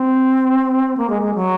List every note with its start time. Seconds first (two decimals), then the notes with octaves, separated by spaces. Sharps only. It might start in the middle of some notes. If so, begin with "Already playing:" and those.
Already playing: C4
0.97 A#3
1.10 G#3
1.22 G#3
1.35 F#3